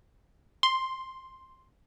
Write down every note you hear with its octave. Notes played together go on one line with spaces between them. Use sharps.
C6